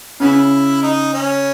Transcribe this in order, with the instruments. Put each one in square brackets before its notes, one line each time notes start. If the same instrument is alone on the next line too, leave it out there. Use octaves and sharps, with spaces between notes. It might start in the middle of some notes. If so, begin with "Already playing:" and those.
[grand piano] C#3 [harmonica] B3 C#4 E4
[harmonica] D#4
C#4